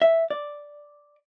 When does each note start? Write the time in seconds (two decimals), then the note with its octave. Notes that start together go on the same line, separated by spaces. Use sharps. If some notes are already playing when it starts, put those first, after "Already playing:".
0.02 E5
0.30 D5